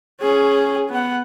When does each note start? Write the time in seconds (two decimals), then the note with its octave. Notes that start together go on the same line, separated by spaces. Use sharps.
0.20 C#4 G#4
0.89 B3 F#5